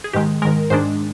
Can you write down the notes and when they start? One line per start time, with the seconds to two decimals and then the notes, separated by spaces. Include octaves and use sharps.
0.04 G#4
0.13 G#2 D#3 G#3 G4
0.42 G#2 D#3 G#3 A#4
0.70 G#2 D#3 G#3 D4 C5